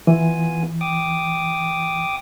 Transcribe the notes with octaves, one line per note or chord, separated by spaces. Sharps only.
E3 B3 F4 G#5
G5 D6 D#6